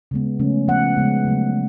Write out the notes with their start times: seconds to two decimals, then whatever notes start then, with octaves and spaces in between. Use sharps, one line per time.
0.11 C#3 G#3 B3
0.39 C#3 F3 A3 C#4
0.68 F3 B3 F#5
0.97 C#3 G#3 B3
1.25 C#3 F#3 A3